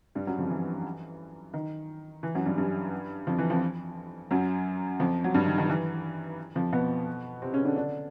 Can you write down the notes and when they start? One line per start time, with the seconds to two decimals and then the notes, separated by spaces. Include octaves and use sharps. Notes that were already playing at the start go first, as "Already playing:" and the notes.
0.15 G2 G3
0.27 F#2 F#3
0.38 F2 F3
0.50 E3
1.54 D#3
2.23 E3
2.35 F#2 F#3
2.46 G2 G3
2.58 G2 G3
3.27 F2 F3
3.39 E3
3.50 F2 F3
4.31 F#2 F#3
5.00 F2 F3
5.24 F#3
5.34 G2 G3
5.46 D#3
5.58 D#3
5.69 E3
6.55 F2 F3
6.73 B2 B3
7.42 C3 C4
7.53 C#3 C#4
7.65 D3 D4
7.76 D3 D4